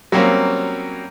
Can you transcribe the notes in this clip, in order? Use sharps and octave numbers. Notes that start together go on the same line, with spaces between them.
F#3 G3 A#3 C4 C#4